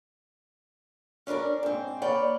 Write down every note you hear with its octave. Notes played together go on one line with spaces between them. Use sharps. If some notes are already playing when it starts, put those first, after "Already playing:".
C#4 D4 E4 A#4 D5
G#2 C4
A#3 B4 C#5 D5 G5